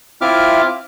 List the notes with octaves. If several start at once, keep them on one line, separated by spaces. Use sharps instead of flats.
C4 E4 F4 E5 D6 F6